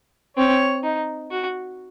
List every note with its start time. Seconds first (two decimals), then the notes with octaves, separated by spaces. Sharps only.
0.37 C4 C#5
0.84 D#4
1.31 F#4